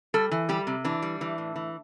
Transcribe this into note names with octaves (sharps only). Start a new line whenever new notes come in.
G3 A4
E3
G3 G4
C3
E3 D4
G3
E3
A2
E3